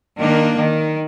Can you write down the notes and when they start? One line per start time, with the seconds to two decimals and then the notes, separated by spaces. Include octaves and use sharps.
0.20 D#3 A#3 D4
0.59 D#3